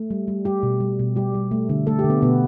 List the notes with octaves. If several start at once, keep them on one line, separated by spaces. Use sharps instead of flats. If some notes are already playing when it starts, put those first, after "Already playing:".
Already playing: A3
G3
G3
G3 G4
B2
G3
B2
G3 G4
G3
A3
D3
A3 A4
G4
D3
B3
B2 B3